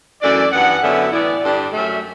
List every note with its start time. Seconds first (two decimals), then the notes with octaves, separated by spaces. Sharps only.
0.20 F#2 E3 A3 D4 D5
0.51 G2 E3 B3 F#5
0.81 F#2 D3 F#3 B3 E4 E5
1.11 A2 E3 B3 E4 D5
1.42 G2 D3 G3 D4
1.72 F#2 F#3 A3 E5